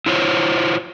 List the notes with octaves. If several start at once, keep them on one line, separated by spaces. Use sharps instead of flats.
E4 F4 C5 C#5